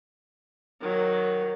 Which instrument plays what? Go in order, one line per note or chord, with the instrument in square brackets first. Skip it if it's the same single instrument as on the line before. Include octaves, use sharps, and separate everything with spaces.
[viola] D#3 F#3